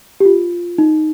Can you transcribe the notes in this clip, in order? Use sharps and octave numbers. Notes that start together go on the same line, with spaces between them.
G4
F4
D#4